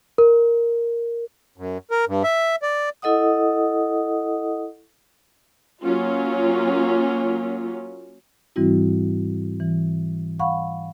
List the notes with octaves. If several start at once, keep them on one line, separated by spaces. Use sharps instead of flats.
A#4
F#2
A#4
G2
E5
D5
E4 A4 D#5 F#5 D#6
F#3 A#3 C#4 F4
G#2 E3 G3 C4 E4 F#4
E3
F5 F#5 B5 C#6